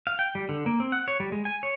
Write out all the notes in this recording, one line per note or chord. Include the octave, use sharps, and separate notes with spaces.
F5
G5
G3
D3
A#3
C4
F#5
C#5
G3
G#3
G#5
C#5